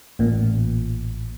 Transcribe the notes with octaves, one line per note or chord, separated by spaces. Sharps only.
A1 A#2